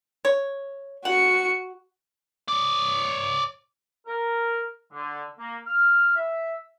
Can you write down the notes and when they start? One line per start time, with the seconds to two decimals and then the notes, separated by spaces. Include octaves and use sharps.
0.25 C#5
1.05 F#4 F#5 C#7
2.48 C#5 D5
4.07 A#4
4.92 D3
5.38 A#3
5.65 F6
6.15 E5